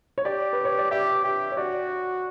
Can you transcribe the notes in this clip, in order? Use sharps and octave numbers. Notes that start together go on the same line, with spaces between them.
C#5
G4 D5
B4
C#5
D5
G4 E5
G4
C#5
F#4 D5